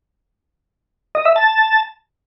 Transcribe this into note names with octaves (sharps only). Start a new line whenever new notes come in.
D#5
E5
A5